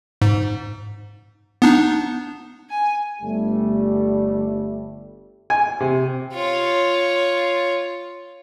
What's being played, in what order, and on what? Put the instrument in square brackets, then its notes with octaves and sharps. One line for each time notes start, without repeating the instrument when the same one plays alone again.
[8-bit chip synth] G#2
B3 D4 D#4
[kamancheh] G#5
[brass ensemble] G1 G3 A3
[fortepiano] G#5
C3
[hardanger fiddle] F4 C#5